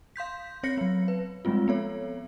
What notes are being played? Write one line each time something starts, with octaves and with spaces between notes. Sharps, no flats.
F5 C6 G6 B6
C4 C#5 A#6 C#7
F#3 B3
B4
F3 G3 G#3 C4 F4
B3 A4 C#5